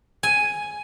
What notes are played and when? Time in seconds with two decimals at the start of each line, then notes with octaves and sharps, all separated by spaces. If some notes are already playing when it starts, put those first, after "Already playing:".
0.23 G#5